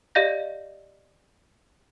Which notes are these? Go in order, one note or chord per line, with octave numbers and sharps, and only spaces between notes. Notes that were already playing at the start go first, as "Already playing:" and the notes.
G4 D5 D#5 F5 G6 A#6